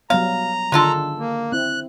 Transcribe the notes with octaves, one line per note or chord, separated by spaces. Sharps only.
F#3 G3 B3 F5 A#5
D3 D#3 G#3 D4 F4 A4
A#3
C4 E4 F#6